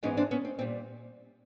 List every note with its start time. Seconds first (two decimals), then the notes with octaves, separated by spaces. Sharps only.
0.03 G#2 E3 G#3 B3 C#4 D#4
0.17 C4 D4
0.31 B3 C#4
0.45 C4
0.59 A#2 G3 C4